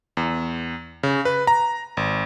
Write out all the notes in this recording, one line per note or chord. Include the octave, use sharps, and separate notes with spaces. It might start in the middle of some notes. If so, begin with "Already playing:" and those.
E2
C#3
B4
A#5
G#1